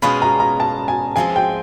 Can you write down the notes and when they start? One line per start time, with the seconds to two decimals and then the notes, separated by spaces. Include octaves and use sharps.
0.02 B2 G#3 C#4 F4 G#4 B5
0.22 A#5
0.40 A#5
0.60 A5
0.88 G#5
1.16 F3 G#3 C4 G#5
1.36 G5